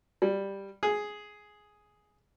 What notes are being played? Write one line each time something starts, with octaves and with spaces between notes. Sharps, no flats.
G3
G#4